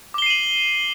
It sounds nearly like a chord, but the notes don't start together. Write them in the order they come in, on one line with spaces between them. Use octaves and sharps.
D6 G7 C7 D#7 F#7